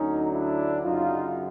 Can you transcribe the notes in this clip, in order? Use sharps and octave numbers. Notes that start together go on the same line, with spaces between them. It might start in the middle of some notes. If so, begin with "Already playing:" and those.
Already playing: D2 D3 F#3 C#4 D#4
D4 E4
F#2 C#3 F#3 D#4 F4